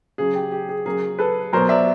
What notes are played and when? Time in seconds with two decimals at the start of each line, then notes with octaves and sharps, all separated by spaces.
0.18 C#3 F#3 G#4
0.35 G4
0.52 G4
0.69 G#4
0.85 C#3 F#3 G#4 A#4
1.19 A4 B4
1.53 B2 F#3 A#4 C5
1.69 D5 E5